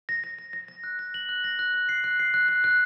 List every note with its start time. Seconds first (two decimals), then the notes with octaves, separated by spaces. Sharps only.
0.09 A#6
0.24 A#6
0.39 A#6
0.53 A#6
0.68 A#6
0.84 F#6
0.99 A#6
1.14 F#7
1.29 F#6
1.44 A#6
1.59 F#6
1.74 F#6
1.89 C7
2.04 F#6
2.19 C7
2.34 F#6
2.49 F#6
2.64 F#6